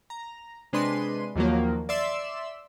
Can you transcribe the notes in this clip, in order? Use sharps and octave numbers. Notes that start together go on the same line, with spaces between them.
A#5
C3 G#3 D4 B4 C6 D#7
D#2 D#3 F3 F#3 A#3
D5 E5 C6 E6